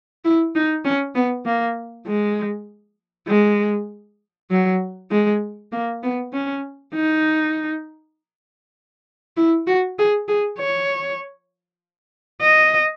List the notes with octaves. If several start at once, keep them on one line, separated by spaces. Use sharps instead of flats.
E4
D#4
C#4
B3
A#3
G#3
G#3
F#3
G#3
A#3
B3
C#4
D#4
E4
F#4
G#4
G#4
C#5
D#5